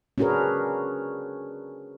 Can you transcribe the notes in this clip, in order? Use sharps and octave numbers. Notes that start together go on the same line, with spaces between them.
C#4 D4 F#4 G#4 A#4 B4